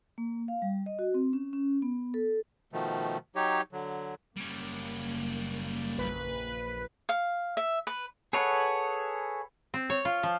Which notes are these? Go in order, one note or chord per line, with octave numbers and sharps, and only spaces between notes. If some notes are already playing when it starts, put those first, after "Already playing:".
A#3
F5
G3
D#5
F#4
C4
C#4
C#4
B3
A4
B2 D#3 F3 A3
F#3 D#4 G4 C#5
D3 F#3
F#1 G3 A#3 C#4
A#1 B4
F5
E5
B4
G#4 A4 B4 C#5 F#5
C4
C#5
F4
F3